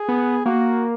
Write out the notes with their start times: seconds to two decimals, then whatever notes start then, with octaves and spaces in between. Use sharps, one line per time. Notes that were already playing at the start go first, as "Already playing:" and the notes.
Already playing: G#4
0.08 B3
0.46 A#3 F#4